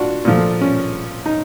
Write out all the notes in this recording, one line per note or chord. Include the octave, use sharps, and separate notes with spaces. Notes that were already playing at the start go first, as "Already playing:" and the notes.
Already playing: D4 F4 F#4
A#2 F3 A3
C#4
D#4